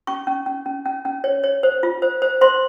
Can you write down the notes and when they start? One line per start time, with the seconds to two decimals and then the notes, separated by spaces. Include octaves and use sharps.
0.07 C#4 C#6
0.27 C#4
0.46 C#4
0.66 C#4
0.86 C#4
1.05 C#4
1.24 C#5
1.44 C#5
1.63 C5
1.83 F4
2.02 C5
2.22 C5
2.41 C5 C6